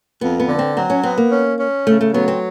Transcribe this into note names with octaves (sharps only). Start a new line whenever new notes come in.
F2 B3
B3
D3
C4
F#3 C4
C#4
B3 C4
A#3
C#4
C#4
C#3 A3
A3
F#3 B3
C4